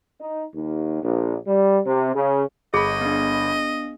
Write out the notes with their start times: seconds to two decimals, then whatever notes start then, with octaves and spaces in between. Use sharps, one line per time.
0.20 D#4
0.54 D#2
1.03 A#1
1.47 G3
1.86 C3
2.15 C#3
2.74 G1 G#4 D#5 B5
3.01 B3 D4